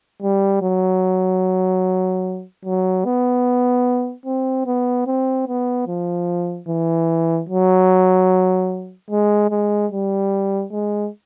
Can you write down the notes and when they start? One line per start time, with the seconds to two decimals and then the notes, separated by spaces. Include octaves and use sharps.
0.22 G3
0.62 F#3
2.65 F#3
3.05 B3
4.26 C4
4.66 B3
5.07 C4
5.47 B3
5.88 F3
6.68 E3
7.49 F#3
9.10 G#3
9.50 G#3
9.92 G3
10.72 G#3